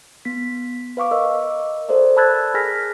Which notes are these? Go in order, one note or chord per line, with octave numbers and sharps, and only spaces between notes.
B3 B6
B4 F5 C#6 D6
A#4 D#5 E6
A4 A#4 C5 D5 E5
A5 B5 E6 F#6 G#6 A6
G#4 A#4 G#5 F6 A#6 B6